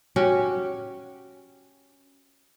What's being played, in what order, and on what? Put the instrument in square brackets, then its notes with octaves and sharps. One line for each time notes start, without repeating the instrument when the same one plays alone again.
[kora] C#4 F#4 G4